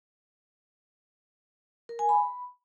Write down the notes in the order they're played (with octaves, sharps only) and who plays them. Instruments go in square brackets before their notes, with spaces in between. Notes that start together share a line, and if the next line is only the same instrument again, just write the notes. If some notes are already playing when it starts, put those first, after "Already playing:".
[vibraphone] A#4
G#5
B5